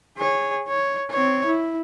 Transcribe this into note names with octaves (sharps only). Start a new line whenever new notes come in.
G#4 C#5
C#5
C4 C#5
E4